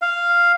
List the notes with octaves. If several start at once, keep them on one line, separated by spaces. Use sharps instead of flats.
F5